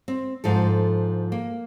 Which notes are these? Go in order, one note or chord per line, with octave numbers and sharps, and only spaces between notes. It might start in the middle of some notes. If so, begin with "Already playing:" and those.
C4
G#2 F3 D4 A4
A#3